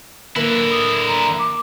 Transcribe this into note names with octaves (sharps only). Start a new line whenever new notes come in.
D3 A#3 E4 B4
D#6
A#5
D6